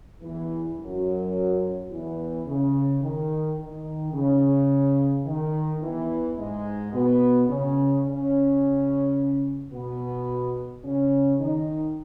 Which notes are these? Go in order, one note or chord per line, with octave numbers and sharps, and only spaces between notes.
E2 E3
F#2 F#3
E2 E3
C#3
D#3
D#3
C#3
D#3
E2 E3
G#2 G#3
B2 B3
C#3 C#4
C#3 C#4
B2 B3
C#3 C#4
D#3 D#4